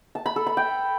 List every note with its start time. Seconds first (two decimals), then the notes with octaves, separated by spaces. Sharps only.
0.15 A5
0.26 B5
0.36 A4
0.47 B5
0.57 G5